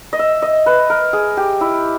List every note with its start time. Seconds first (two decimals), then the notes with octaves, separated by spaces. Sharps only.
0.13 D#5
0.19 E5
0.42 D#5
0.66 B4
0.90 A#4
1.13 G#4
1.37 G4
1.61 E4